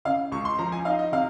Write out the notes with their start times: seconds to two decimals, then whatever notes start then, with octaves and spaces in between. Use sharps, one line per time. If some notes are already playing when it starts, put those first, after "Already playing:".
0.05 C#3 F5
0.32 C#2 C#6
0.45 C6
0.59 F3 A#5
0.72 G#5
0.85 D#4 F5
0.99 D#5
1.12 C3 F5